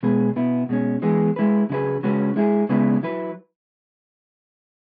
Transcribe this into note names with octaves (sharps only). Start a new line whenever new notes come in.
B2 G#3 B3 G#4 B4
B2 B3 E4
B2 G#3 C#4
E3 G#3 B3 G#4
G#3 E4 B4
C#3 F#3 E4 G#4 B4
C#3 G#3 C#4 F#4 B4
G#3 E4 G#4
C#3 G#3 B3 E4 B4
F#3 E4 B4